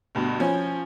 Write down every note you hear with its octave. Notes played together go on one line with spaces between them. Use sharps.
D2 G2 B2
F3 C#4